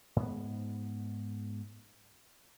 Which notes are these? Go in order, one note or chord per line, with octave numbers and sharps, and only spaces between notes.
G#2 B3